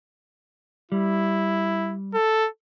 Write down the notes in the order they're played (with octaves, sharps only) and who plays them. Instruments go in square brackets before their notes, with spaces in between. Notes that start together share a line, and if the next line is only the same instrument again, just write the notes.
[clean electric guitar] G3 [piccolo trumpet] E4
[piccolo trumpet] A4